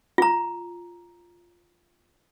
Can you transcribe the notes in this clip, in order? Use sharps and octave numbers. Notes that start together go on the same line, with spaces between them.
F4 A#5